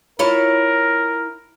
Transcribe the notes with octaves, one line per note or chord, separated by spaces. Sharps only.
E4 F4 A#4 C#5